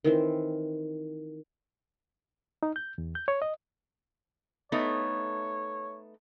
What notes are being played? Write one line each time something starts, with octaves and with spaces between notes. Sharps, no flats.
D#3 E3 C4
D#4
G6
E2
G6
C#5
D#5
A3 B3 D#4 C#5